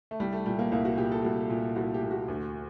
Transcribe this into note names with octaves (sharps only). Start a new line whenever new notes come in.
A3
C2 G3
A3
A#2 G3
A#3
C2 A#3
F#4
A#2 G4
A4
C2 F#4
A#2
C2 F#4
G4
A#2
F#4
D2